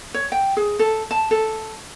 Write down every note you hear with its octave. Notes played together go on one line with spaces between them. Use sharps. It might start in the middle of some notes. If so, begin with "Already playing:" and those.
C#5
G5
G#4
A4
A5
A4